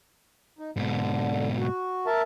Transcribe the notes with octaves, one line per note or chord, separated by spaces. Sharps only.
D#4
G#2 B2 D3
F#4
A#4 E5 A5